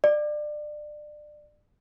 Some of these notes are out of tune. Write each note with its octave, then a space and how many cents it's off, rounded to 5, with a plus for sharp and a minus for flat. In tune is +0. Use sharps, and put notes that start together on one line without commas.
D5 +25